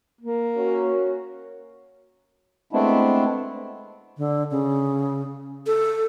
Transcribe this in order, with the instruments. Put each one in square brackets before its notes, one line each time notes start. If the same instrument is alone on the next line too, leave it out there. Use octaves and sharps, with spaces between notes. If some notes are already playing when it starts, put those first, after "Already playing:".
[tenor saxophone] A#3
[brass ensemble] C#4 F#4
[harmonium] G#3 A3 B3 C4 D4 E4
[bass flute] D3
C#3
A4